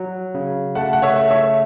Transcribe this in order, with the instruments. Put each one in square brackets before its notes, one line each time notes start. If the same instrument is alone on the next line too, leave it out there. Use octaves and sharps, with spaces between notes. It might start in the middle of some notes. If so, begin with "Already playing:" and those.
Already playing: [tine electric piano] F#3
C#3
[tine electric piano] A3 [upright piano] F#5 A5
[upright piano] F#5
C#5 E5
[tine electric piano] A3
[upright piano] C#5 E5